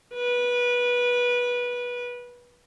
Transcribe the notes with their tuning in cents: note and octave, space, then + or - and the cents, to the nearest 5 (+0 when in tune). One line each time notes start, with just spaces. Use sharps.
B4 -20